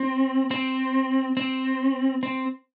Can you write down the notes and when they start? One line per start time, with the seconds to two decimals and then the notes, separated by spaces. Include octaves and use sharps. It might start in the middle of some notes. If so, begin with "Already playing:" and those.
Already playing: C4
0.51 C4
1.37 C4
2.23 C4